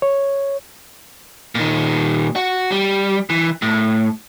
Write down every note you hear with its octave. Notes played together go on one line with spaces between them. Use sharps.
C#5
A#2 D#3
F#4
G3
E3
A2